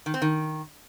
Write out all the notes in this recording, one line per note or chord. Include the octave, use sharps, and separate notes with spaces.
D#3
C4
D#3